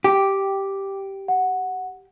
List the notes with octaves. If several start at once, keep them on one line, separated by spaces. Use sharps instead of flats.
G4 G5 D6
F#5